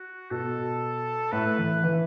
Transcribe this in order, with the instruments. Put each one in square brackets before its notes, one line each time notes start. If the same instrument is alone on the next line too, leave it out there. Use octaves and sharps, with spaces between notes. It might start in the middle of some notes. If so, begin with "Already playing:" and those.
Already playing: [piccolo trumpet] F#4
[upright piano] B2 [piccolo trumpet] A4
[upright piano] A2 [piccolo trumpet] B4
[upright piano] E3
E3